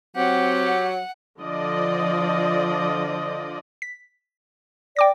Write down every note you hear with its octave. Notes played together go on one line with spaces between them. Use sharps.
F#3 C4 G4 F#5
D3 F3 D5 D#5
B6
D5 G5 D6 A#6